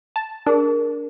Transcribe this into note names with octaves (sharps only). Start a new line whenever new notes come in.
A5
D4 G#4 A#4